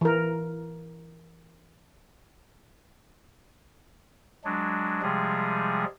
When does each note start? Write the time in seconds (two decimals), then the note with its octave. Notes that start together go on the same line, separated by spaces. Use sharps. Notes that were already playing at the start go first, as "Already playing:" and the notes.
0.01 E3 A#4
4.44 F#3 G#3 D4
5.02 C3 F3 G3 G#3 G#4